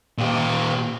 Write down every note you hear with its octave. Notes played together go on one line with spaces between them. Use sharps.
A#2 G4